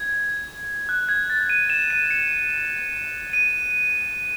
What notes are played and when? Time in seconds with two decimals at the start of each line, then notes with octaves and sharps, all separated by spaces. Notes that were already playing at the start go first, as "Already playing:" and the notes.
Already playing: G#6
0.89 F#6
1.08 G#6
1.30 A6
1.50 D#7
1.70 E7
1.90 D#7
2.10 C#7
3.33 D#7